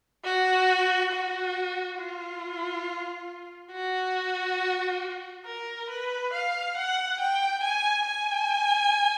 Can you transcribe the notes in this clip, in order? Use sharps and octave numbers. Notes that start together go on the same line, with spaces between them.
F#4
F#4
F4
F#4
A#4
B4
F5
F#5
G5
G#5
G#5